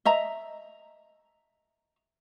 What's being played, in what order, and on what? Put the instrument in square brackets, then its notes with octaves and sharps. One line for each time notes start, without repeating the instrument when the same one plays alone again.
[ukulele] D#5 E5 A#5